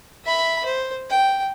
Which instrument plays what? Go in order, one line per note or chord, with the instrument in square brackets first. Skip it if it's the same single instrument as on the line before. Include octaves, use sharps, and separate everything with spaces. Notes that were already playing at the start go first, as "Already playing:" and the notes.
[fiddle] E5 B5
C5
G5